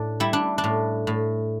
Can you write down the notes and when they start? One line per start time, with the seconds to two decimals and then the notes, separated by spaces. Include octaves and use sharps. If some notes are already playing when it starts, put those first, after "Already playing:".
Already playing: A2 D4
0.20 G3 E4
0.33 D4
0.58 D4
0.64 A2
1.07 A2